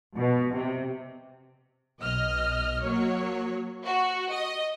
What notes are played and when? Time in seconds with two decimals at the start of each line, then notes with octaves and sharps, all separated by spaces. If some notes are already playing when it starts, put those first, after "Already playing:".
0.14 B2
0.52 C3
2.00 B1 D#5 F6
2.82 F#3 A#3 C#5
3.85 F#4
4.32 D#5